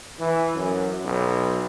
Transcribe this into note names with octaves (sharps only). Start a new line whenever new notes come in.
E3
F#2
B1